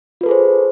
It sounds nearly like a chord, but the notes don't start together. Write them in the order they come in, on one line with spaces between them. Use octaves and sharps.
F4 B4 A4 G#4 C5